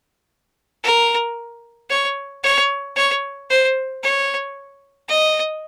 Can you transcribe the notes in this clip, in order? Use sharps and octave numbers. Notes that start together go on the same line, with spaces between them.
A#4
C#5
C#5
C#5
C5
C#5
D#5